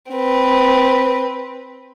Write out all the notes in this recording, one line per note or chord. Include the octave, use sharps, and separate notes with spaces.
C4 B4